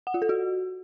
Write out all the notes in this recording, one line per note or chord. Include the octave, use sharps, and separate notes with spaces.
F#5
F4
A4
F#4